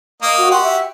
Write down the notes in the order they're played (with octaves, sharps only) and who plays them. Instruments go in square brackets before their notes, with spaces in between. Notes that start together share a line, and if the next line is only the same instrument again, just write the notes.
[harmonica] A#3 D#5
[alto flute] F#4
[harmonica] F#4 G4 [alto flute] C6
[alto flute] E5